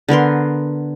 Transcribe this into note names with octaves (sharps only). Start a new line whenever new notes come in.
D3 B3 A#4 C6